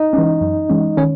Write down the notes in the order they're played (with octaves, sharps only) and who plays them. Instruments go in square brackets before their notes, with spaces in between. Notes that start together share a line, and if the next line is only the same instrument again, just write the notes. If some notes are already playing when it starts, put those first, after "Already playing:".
Already playing: [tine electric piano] D#4 D#5
[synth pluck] E3 G#3 C#4
F#2
E3 G#3 C#4
[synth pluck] D#3 [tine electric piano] C#4 C#5